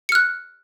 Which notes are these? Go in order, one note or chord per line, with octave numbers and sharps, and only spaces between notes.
F6 F#6 C#7